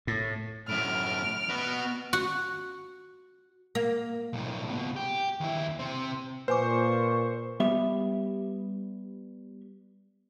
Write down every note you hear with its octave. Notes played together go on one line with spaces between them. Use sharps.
A2
F#2 A2 F6 D7
B3 F#4
F#4
A#3
B1 A2
C#2 B2
G4
D#2 E4
C3 C4
A#2 B4 C5 G#5 C#6 D6
G3 B3 G4 E5